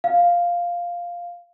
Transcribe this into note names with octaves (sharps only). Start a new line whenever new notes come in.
F5